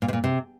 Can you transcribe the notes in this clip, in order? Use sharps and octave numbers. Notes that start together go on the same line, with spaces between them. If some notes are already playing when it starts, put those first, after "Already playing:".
A#2
C3
A#2
C3